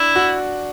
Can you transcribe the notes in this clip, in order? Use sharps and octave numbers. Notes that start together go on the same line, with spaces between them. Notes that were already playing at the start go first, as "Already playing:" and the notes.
Already playing: D4 E4
F#4